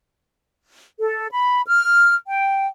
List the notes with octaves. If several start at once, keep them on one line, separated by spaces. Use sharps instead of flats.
A4
B5
F6
G5